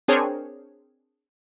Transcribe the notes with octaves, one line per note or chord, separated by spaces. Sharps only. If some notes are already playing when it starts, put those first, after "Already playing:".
C4 D4 G#4 A#4 C5 C#5